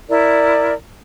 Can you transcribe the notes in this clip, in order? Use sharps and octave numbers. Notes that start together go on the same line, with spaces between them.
E4 A#4 D5